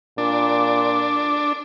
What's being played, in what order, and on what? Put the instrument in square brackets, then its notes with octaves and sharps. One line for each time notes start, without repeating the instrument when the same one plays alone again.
[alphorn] A#2 [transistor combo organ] D4